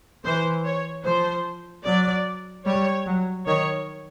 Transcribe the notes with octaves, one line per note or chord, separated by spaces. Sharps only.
E3 C5
C#5
F3 C5
F#3 D5
G3 C#5
F#3
D#3 C#5